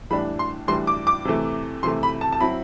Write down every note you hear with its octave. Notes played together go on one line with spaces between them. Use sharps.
A2 E3 G3 D4 B5
C6
A2 E3 G3 D4 C6
D6
D6
C3 E3 A3
C3 E3 A3 C6
B5
A5
A5
F#3 C4 E4 B5